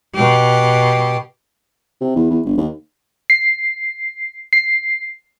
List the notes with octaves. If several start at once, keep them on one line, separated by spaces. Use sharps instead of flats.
B2 G4
C3
E2
E2
G1
D#2
C7
C7